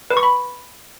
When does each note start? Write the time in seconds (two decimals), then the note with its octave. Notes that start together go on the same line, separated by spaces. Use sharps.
0.10 B4
0.17 C#6
0.23 B5